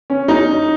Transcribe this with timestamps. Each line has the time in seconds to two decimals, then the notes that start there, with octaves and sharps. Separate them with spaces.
0.10 C#4
0.28 D#4